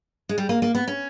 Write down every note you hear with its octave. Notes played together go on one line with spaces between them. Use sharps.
G#3
G3
A#3
A#3
B3
C#4